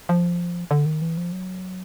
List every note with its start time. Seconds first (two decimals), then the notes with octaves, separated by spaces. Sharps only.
0.09 F3
0.71 D3
0.86 D#3
1.02 E3
1.17 F3
1.32 F#3